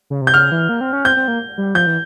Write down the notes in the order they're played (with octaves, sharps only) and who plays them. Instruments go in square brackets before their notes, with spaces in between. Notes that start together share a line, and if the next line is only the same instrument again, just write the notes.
[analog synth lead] C#3
C3
[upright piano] G6
[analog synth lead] C#3 [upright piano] F6
[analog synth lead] E3
A#3
C4
C#4
[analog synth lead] C4 [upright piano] G6
[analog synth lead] C4
A#3
G3
[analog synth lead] F3 [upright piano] G6
[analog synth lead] E3